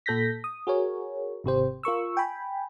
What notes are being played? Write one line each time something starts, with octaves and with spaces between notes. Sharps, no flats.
A#2 A4 G6 A#6 B6
D#6
F#4 G#4 A#4 C#5
G#1 C3 G4 C5
F4 A#4 C#6 E6
G5 G#5 B5